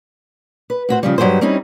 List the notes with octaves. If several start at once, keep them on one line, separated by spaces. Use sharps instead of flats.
B4
A2 F#4 C5
C#3 F3 G3
G2 F#3 G4 G#4 C5
G3 C4 C#4 D#4 E4